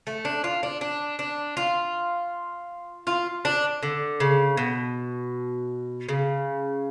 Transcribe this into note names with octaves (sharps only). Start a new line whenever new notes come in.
A3
D4
F4
D4
D4
D4
F4
F4
D4
D3
C#3
B2
C#3